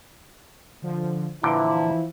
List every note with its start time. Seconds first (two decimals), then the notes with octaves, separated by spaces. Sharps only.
0.82 D3 F3
1.43 A#2 D3 E3 F3 E4 G5